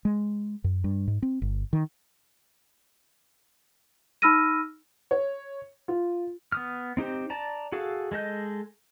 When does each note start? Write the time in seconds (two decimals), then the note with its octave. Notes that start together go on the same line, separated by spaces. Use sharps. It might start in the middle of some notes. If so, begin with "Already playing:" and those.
0.05 G#3
0.64 F#2
0.84 G2
1.07 G#2
1.22 C4
1.42 G1
1.73 D#3
4.22 D#4 B5 E6 F6 A#6 D#7
5.11 C#5
5.88 F4
6.52 B3 D#6 F6
6.97 C4 D#4 G4 C5
7.30 D5 A5 A#5
7.72 F#4 G#4 A4 F5
8.12 G#3 A4 D#5 G6